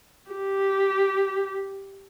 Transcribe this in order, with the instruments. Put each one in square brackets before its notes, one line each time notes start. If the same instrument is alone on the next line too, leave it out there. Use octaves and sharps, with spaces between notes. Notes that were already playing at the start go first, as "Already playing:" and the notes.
[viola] G4